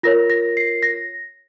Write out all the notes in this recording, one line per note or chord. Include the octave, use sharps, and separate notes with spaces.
F4 A#4 C#5 A#6
A#6
C7
A#6